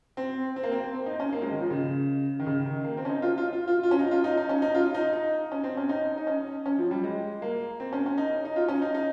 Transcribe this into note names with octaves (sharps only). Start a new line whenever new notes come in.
C4
C4
A#3
C4
C4
D#4
C#4
A#3
G#3
D#3
F3
C#3
D#3
C#3
D#3
A#3
C4
C#4
D#4
F4
F4
F4
F4
F4
C#4
D#4
F4
D#4
D#4
C#4
D#4
F4
D#4
D#4
C#4
C4
C#4
D#4
D#4
C#4
C#4
F3
G3
G#3
A#3
C4
C#4
C#4
D#4
D#4
F4
C#4
D#4
D#4